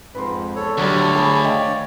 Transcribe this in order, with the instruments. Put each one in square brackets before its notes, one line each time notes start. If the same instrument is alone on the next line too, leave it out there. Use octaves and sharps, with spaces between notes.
[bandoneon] F2 G#2 [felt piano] B4 C6
[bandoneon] E2 A4 C#5
[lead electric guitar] D2 [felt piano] F#3 G3 [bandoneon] C#5 D5
[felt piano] G#4 B5
D#5 F5 G5